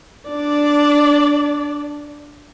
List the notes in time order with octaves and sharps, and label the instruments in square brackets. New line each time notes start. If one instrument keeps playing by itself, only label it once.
[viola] D4 D5